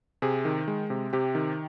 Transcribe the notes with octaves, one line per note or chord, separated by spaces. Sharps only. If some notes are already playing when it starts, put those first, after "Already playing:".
C3 G#4
D#3
G#3
C3
C3 G4
D#3